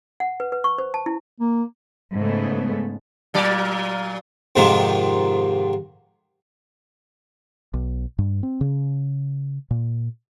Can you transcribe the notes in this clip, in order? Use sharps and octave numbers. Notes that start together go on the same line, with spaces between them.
F#5
B4
B4
C#6
C5
A5
E4
A#3
G#2 C#3 A3 B3
A#2 F#3 D5
F2 G#2 C3 D#3 F3
B1
G2
C4
C#3
A#2